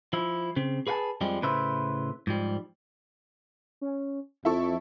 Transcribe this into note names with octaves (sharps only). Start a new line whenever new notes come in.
F3 E4
C#3 C4
G#4 B4 F5 F#5 G#5 A5
F2 F3 G3 G#3
A2 C#3 B4 C5 E5
G#2 F3 G3
C#4
F2 F3 E4 A4 C#6